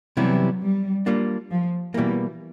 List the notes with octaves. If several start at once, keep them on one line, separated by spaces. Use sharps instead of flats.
C3 E3 F#3 G3 B3 E4
G3
G3 A#3 D4 F4
F3
B2 E3 G3 A#3